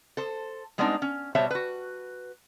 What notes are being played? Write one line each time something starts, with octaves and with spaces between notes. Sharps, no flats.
A4 C5
G3 G#3 B3 C4 D4 D#4
C#4
B2 G3 C5 C#5 E5 A5
F#4 B4